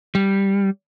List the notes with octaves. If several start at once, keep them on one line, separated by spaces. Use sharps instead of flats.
G3